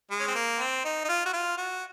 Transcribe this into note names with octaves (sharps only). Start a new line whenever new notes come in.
G#3
C#4
C4
A#3
C4
D#4
D#4
F4
F#4
F4
F#4